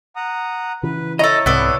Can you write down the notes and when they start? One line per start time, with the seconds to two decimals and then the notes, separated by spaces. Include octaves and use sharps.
0.16 F#5 A#5 D#6
0.83 C#3 E3 B4
1.19 E4 A4 C#5 D#5 A#5
1.46 C2 G#2 C3 B3 D4 A4